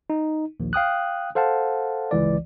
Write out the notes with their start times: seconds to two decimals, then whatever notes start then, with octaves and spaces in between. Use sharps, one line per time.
0.10 D#4
0.60 A#1 D#2
0.73 F5 G5 D#6 F#6
1.35 A4 C5 F5 F#5 A5
2.11 G1 C#2 E3 D5